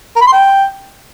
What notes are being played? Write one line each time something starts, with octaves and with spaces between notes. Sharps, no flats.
A#4
B5
C6
G5